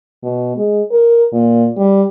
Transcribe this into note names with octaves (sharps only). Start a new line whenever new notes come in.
B2
G#3
A#4
A#2
G3